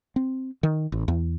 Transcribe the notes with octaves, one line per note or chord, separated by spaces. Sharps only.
C4
D#3
A1
E2